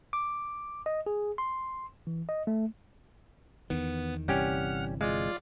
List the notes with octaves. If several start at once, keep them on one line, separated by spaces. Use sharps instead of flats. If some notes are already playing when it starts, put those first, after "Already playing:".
D6
D#5
G#4
C6
E3
D#5
A3
E2 D#3 B3
G1 C3 E3 G3 C#4 G4 F#5 F6
G#3 F4 D5 F5